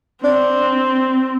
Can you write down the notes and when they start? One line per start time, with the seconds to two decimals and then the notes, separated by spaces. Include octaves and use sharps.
0.24 C4 D4